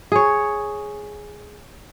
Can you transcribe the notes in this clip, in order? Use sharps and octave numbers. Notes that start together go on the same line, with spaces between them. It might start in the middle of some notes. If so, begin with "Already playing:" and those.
G#4 C#5